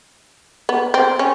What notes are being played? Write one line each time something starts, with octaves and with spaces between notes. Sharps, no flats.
B3
C4
C#4